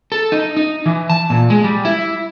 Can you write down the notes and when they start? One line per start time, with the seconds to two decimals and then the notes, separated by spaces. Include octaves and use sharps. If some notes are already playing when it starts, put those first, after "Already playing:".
0.12 A4
0.32 D#4
0.57 D#4
0.86 E3
1.10 A5
1.30 A#2
1.50 G#3
1.64 G3
1.85 E4